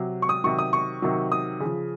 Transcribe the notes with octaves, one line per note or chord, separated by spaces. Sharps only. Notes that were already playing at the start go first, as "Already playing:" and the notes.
Already playing: C3 F#3
C#6
D#6
C3 D#3 F#3 C#6
D#6
C#6
C3 D#3 F#3
D#6
C#3 F3